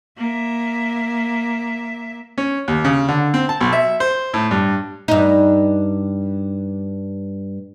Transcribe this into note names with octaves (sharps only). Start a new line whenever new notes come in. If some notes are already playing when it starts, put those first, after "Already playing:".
A#3 E5
C#4
D#2
C#3
D3
C4
A5
B1
E5
C5
A2
G2
G2 D#4